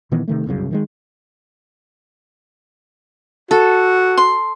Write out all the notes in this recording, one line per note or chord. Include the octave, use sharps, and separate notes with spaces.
A#2 D#3 E3 B3
C3 D#3 A3
G1 C2 F#2 C#3
D#3 E3 G#3
F#4 A4
C6